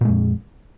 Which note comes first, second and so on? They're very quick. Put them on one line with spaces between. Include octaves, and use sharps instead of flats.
A#2 G#3 F2